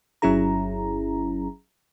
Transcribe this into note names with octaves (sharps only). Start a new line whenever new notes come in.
G1 F#3 C#4 E4 G#4 A#5